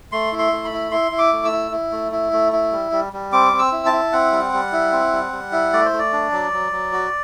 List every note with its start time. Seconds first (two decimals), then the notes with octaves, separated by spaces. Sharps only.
0.12 A3 C6
0.32 E4
0.39 C6
0.52 A3
0.65 B5
0.72 E4
0.91 E4 C6
1.12 E4
1.18 D6
1.32 A3
1.45 E6
1.52 E4
1.71 E4
1.91 A3
2.12 E4
2.33 A3
2.52 E4
2.72 G3
2.92 G3
3.13 G3
3.32 C4 D6
3.53 C4
3.59 E6
3.72 E4
3.86 A5
3.92 E4
4.13 C4 F#5
4.32 G3
4.53 G3
4.72 E4
4.92 C4
5.12 G3
5.32 G3
5.52 E4
5.73 A3 D5
5.85 C5
5.93 A3
5.99 D5
6.13 D4
6.32 F#3
6.53 F#3
6.72 F#3
6.93 F#4